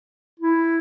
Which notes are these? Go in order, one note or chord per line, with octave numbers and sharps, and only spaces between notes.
E4